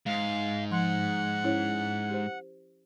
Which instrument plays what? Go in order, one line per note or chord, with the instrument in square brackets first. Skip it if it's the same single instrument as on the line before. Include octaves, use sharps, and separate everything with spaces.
[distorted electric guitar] G#2 [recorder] F5
[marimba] F3 C6 [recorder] F#5
[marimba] C#4 E4 C#5
G4 C5